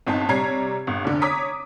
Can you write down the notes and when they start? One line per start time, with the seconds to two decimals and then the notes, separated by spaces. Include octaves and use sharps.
0.07 G1 C4 D#4 A5
0.28 C3 G3 C#5 A#5 G#6 C7
0.87 G1
1.05 F1 D3
1.22 C#5 A#5 D6 D#6 B6